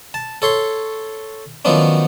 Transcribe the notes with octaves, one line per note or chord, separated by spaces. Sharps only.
A5
A4 C#5 C6
D#3 F3 F#3 B3 C#4 D4